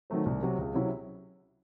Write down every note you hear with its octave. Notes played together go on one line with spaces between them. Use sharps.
D#3 F#3 A3 C4
C2
C3 F#3
C#2
C3 F#3 C#4 E4